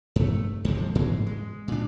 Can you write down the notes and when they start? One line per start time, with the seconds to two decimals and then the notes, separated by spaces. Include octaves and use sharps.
0.16 G2 A3
0.65 F2 G3 G#3
0.78 F3
0.95 G#2 E3 G#3
1.26 G#3
1.68 A#2 D4